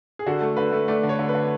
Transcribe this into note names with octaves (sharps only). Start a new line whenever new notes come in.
G#4
D3 F#4
A3
D3 B4
A3
A3 D5
D3
C#5
D3
B4
D3